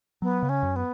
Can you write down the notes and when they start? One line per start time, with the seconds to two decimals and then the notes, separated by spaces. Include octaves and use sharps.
0.22 F#3 B3
0.43 C#3
0.49 C#4
0.63 F#2
0.76 B3